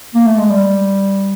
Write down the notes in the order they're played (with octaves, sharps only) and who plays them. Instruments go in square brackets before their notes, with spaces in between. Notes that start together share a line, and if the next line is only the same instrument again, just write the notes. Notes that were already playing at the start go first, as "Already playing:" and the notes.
[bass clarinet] A#3
A3
G#3
G3